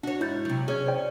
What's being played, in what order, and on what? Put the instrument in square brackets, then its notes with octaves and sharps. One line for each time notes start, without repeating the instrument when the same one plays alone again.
[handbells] D4 [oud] F#4 C#5
[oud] G#2 [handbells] E4 G6 A6
[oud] C3 F#3
[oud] C#4 [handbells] G#4 C#5 G#6
[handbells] C5 D5 G5